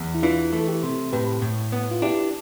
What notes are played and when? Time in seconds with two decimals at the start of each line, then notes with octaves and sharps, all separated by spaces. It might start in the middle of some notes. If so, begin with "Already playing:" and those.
Already playing: E2
0.15 E4
0.23 E3 D4 F4
0.53 A3 A4
0.68 E4 G4
0.83 C3
1.12 A2 G4 B4
1.42 A2
1.72 B3
1.91 F4
2.02 D4 E4 G4